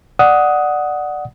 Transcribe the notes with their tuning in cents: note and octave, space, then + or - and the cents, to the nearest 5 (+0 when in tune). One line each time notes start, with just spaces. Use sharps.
D5 +10 F#5 +0 D#6 +15